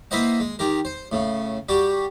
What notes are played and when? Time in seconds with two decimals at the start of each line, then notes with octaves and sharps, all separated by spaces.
0.11 A#3 E4 B4 C5 D#5 F#5
0.40 G#3
0.59 D#3 G4 A#4
0.85 C5
1.12 A2 C#3
1.69 G3 F#4 G4